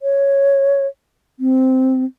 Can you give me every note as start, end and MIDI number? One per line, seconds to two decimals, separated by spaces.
0.02 0.86 73
1.40 2.05 60